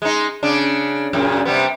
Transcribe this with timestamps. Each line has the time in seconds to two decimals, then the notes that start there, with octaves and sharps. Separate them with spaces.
0.02 G#3 D#4
0.43 C#3 D4
1.13 F#2 A#2 C#3
1.45 C3 G3 B3